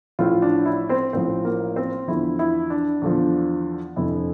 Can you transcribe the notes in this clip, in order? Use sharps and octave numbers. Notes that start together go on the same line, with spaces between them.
A1 A2 F3 F4
D4
E4
C4 C5
A1 A2 F3 C4 C5
A#3 A#4
C4 C5
E2 D3 F3 E4
E4
D4
E2 D3 F3
F1 F2 D3 E4